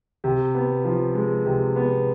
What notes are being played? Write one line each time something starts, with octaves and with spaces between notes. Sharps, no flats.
C3
B3
F3
G#3
C3
B3